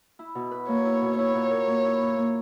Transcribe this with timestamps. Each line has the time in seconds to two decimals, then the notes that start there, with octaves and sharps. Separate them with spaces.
0.19 E4
0.35 B2
0.51 B4
0.68 A#3 C#5
0.85 E4
1.02 B2
1.18 E4 C#5
1.35 A#2
1.51 A#4
1.67 A#3
1.85 E4
2.01 A#2
2.18 A#3